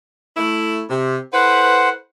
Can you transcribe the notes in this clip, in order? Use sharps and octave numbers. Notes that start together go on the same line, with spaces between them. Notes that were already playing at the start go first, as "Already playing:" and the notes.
A3 E4
C3
E4 A4 B4 C5 F#5